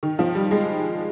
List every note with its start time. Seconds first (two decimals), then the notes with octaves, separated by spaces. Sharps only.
0.03 D#3
0.19 F3
0.35 G3
0.51 G#3